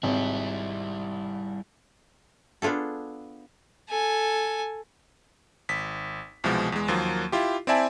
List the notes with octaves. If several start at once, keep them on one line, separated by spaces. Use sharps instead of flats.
G#1 G3 E4
B3 D4 F4 G#4 A4
A4 G#5
G#1 B6
C2 B2 E3 F3 G#3
E2 G#3
D#2 F3 F#3 A#3
E4 F4 G4
C4 E4 D5 E5 G#5 A5